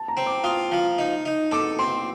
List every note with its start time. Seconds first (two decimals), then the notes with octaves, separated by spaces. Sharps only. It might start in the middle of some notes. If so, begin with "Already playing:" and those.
Already playing: A5
0.08 A#5
0.17 C4
0.26 D6
0.44 F4 D#6
0.72 F3
0.98 D#4
1.26 D#4
1.51 A4 D6
1.79 C4 C6